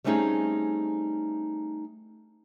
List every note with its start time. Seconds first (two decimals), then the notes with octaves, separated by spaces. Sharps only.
0.04 G3 A3 C4 C#4 D#4 G#4